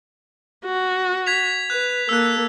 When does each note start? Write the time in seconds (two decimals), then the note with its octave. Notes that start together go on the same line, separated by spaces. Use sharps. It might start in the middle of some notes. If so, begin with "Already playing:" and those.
0.65 F#4
1.26 G#6 B6 F7
1.70 B4 F#6
2.09 A#3 A4 E6 F#6